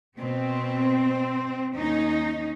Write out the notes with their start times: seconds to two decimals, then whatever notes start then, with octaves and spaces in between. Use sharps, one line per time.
0.19 B2 C4
1.76 D#2 C#4 D#4